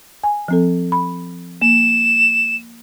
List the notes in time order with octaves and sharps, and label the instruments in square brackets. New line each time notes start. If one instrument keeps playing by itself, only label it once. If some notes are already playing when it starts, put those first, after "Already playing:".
[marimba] G#5
F3 C4 A4
B5
[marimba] A#3 [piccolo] E7